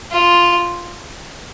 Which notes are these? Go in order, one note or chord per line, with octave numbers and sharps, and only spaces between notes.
F4